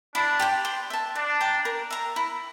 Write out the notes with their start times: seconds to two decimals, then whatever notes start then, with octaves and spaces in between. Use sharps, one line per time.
0.14 D4 E4
0.39 G4 C5 G5
0.65 C5
0.90 E5 A5
1.15 D4 D5
1.41 G5 A#5 D6
1.65 A#4
1.91 E5 A#5
2.16 E4